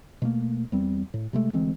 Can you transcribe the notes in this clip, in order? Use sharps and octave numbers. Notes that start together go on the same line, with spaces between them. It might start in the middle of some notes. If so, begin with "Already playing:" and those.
B2 A3 A#3
E2 G3 C4
A2
C3 G#3 A3
D2 E3 G#3 C4